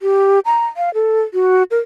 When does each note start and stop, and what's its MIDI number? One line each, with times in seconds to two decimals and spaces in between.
0.02 0.40 67
0.45 0.66 82
0.77 0.93 77
0.94 1.23 69
1.34 1.63 66
1.71 1.79 70